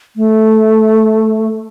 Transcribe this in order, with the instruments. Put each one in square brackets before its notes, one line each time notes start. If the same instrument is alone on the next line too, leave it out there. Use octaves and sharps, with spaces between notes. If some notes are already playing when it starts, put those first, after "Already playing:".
[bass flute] A3